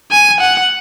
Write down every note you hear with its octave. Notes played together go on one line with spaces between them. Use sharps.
G#5
F#5